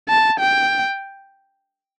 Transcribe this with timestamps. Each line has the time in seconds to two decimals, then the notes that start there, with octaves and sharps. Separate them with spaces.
0.09 A5
0.40 G5